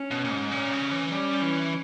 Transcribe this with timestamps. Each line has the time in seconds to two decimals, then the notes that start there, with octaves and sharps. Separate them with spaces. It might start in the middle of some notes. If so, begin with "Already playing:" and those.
Already playing: C#4
0.11 B2
0.24 A#2
0.31 G#2
0.51 A#2 C#4
0.72 C#3
0.91 E3
1.11 G3 C#4
1.41 E3